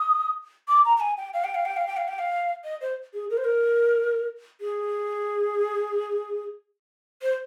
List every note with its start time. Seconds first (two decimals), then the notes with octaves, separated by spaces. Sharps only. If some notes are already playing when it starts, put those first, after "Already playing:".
Already playing: D#6
0.68 D6
0.85 A#5
0.97 A#5
1.00 G#5
1.17 G5
1.34 F5
1.44 G5
1.55 F5
1.65 G5
1.77 F5
1.87 G5
1.97 F5
2.08 G5
2.19 F5
2.64 D#5
2.81 C5
3.14 G#4
3.30 A#4
3.37 C5
3.44 A#4
4.61 G#4
7.22 C5